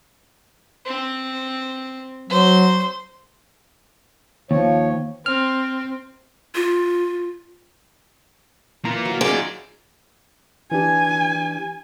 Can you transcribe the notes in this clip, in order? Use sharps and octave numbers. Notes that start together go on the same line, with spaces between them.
C4
F#3 C5 C6
D#2 F3 C#5
C4 F6
F4
E3 A#3 F4 A#5
F#3
D#4 F4 G#4 D5
E3 D4 G4 G#5